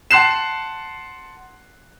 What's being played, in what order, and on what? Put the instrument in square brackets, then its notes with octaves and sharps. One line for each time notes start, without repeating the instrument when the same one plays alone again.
[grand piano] F#5 A5 C6 F#6 C7 E7